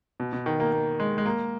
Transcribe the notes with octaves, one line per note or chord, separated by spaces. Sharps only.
B2
B2
D#3
A#3
A#3
G#3
G#3
A#3